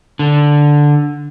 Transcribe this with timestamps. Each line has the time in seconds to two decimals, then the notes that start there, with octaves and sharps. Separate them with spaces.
0.19 D3